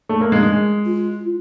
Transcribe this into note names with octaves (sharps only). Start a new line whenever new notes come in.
A3
A#3
G#3
G#3
F4